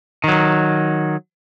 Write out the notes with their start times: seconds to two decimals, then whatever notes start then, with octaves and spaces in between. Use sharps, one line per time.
0.24 D#3 F#3